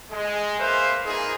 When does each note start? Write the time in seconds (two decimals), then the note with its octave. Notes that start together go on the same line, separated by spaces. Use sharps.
0.11 G#3
0.58 A#3 B4 C5 E5 F5
1.06 A#3 D#4 F4 G#4